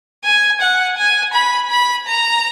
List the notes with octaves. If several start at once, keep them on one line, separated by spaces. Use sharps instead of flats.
G#5
F#5
G#5
B5
B5
A#5